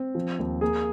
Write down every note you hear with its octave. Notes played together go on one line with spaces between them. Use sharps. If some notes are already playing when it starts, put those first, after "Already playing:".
Already playing: C4
F3
D#2
A#3 G#4